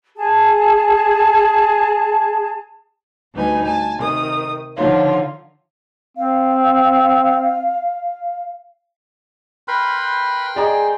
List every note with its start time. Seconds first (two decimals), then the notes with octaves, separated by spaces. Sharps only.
0.16 G#4 A5
3.34 D2 G3 D#4 B4 G#5
3.64 G#5 A5
3.97 C3 D#3 D#6
4.76 D3 D#3 F3 F4 C#5
6.17 C4 F5
9.68 A#4 B4 G5 B5 C6
10.56 G#4 D5 D#5 A#5